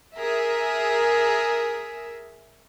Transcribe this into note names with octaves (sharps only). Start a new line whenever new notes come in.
G#4 A#4 E5